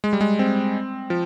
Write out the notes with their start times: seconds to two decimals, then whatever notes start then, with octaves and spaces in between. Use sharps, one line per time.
0.04 G#3
0.13 G3
0.21 G#3
0.39 C4
1.10 F3